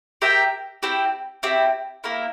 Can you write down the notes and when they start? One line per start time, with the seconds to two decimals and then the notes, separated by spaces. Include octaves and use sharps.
0.22 G4 A#4 E5 G5
0.83 C4 E4 G4
1.43 C4 E4 G4
2.04 A#3 E4 A#4